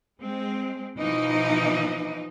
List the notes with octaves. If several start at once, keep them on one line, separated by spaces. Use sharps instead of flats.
G#3 C4
B2 E3 F3 D#4 D#5